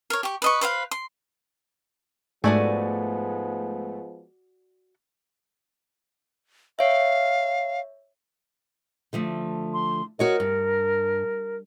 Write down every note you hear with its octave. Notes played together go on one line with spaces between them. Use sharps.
A#4 C#5
G4 C#6
B4 D#5 C#6
B4 C5 D#5 F5
C6
G#2 F3 G#3 A3 B3 F#4 D5 G#5
C#5 E5 F5
D3 F3 A3
C6
F#4 A#4 C#5 D#5
G2